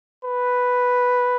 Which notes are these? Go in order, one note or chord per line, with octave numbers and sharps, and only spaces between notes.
B4